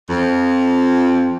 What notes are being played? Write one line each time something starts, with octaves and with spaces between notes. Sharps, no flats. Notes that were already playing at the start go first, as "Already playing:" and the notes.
F2